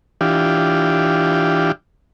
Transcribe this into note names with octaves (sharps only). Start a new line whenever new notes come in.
E3 D4 F4 G4